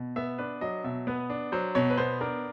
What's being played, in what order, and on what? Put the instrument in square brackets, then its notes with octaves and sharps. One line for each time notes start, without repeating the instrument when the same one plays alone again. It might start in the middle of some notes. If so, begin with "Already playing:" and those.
Already playing: [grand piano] B2
B3 E5
D4 B4
F#3 D#5
B2 E5
B3 B4
D4
F#3 C5
B2 C#5
B4
B3 C5
D4 A#4